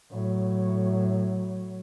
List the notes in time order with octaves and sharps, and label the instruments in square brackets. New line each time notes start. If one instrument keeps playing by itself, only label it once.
[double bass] A2 F#3